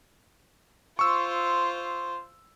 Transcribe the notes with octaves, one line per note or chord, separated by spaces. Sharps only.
F4 C5 C#6 E6